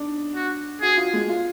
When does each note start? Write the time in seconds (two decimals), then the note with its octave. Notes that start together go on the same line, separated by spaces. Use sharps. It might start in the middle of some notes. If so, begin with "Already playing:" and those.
Already playing: D4 D#4
0.35 F#4
0.82 F#4 G#4
0.97 F4
1.14 G#3
1.29 F4